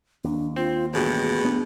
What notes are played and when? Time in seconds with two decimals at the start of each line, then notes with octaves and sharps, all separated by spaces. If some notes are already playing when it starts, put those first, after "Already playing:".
0.24 D#2 D4
0.56 C4 F4
0.94 A1 G2 B2 G#4
1.45 B3 D4